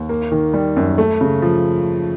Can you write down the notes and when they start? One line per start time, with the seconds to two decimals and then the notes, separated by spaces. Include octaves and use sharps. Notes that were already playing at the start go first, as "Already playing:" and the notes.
Already playing: D#2
0.09 A#3
0.32 D#3
0.54 G3
0.76 F#2
0.98 A3
1.21 C#3
1.42 F3